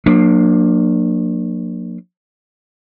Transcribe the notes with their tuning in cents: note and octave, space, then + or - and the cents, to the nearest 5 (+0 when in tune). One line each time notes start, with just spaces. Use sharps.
F#3 -45 A#3 +0 D4 +25